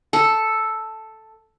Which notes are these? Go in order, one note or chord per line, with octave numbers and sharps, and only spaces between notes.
A4